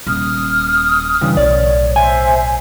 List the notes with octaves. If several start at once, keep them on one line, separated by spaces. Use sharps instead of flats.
D#1 D#6 F6
G2 C#3 E3
B1 A2 C#5 D5
C5 E5 G#5